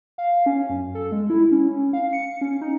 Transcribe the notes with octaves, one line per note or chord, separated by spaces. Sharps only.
F5
C#4
F#2
A4
G#3
E4
C#4
F5
C#7
C#4
D#4